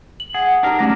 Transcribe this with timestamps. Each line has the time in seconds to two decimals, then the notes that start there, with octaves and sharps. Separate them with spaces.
0.20 F#7
0.34 G#4 F#5
0.63 D4 D#4 G4 A#4 A#5
0.79 D#3 F3 F#3 G#3 A3 C#4 D6 A#6